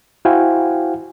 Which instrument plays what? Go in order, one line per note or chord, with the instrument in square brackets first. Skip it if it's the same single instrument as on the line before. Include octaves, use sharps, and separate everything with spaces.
[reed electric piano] E4 F#4 C5 F5 G5 G#5